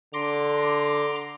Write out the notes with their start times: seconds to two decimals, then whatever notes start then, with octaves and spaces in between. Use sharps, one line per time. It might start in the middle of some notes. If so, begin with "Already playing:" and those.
0.13 D3 A#5 C6 D6